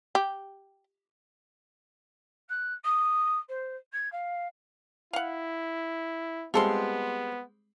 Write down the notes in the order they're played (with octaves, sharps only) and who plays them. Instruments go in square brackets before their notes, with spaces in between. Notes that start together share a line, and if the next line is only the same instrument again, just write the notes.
[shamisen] G4
[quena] F#6
D#6
C5
G#6
F5
[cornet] E4 [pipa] F5 F#5
[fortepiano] G3 G#3 C4 [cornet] B3 [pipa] F4 A4 C6